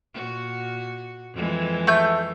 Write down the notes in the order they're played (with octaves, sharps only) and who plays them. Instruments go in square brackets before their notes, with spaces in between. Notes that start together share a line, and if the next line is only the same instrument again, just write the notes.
[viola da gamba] A#2 F#4
F2 E3 G#3
[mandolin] A3 G6